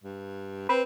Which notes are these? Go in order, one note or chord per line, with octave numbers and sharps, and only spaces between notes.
G2
C4 B4